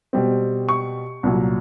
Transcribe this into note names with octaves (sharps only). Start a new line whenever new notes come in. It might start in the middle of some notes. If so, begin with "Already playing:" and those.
B2 G3 C4
C#6
C2 A#2 F#3